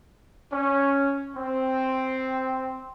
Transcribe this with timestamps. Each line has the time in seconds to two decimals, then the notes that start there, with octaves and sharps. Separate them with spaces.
0.52 C#4
1.35 C4